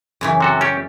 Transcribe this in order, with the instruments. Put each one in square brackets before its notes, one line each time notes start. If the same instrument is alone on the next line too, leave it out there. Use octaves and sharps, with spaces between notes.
[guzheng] F#2 C#3 E3
[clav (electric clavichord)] C3 F#4 A4
[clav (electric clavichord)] C#4 G4 [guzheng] D5